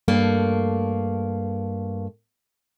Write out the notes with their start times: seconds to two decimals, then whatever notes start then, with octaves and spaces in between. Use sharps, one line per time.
0.08 G2 A3 A#3